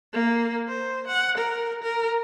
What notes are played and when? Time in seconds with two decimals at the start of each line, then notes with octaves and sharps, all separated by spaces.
0.13 A#3
0.68 C5
1.08 F#5
1.38 A#4
1.82 A#4